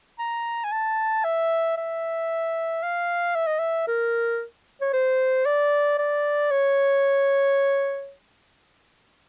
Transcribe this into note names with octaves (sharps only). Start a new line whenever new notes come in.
A#5
G#5
A5
E5
E5
F5
E5
D#5
E5
A#4
C#5
C5
D5
D5
C#5